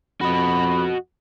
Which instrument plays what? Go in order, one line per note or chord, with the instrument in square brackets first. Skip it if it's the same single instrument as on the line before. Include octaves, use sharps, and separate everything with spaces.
[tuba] F2 [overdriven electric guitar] F#4 D#5 [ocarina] B5